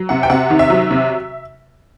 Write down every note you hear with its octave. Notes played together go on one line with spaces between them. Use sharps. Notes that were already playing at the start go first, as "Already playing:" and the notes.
Already playing: F#3
C3 F#5
G5
C3 F#5
D#3
E5
F#3
C3